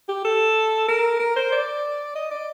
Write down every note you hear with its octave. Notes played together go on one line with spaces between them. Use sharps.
G4
A4
A#4
A#4
C5
D5
D#5
D5